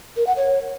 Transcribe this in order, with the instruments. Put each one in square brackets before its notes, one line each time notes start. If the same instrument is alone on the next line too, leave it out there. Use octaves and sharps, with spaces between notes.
[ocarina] A#4
F#5
C#5